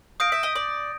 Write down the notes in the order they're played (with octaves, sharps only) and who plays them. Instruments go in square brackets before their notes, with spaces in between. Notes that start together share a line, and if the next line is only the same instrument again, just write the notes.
[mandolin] F5 [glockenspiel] D#6 G6 A#6 D7
[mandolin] E5
D#5
D5